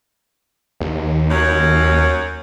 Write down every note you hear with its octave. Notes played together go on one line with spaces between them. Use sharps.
D#2
F#2 C#5